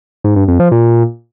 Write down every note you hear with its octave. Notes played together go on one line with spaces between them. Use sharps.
G#2
G2
F2
F3
A#2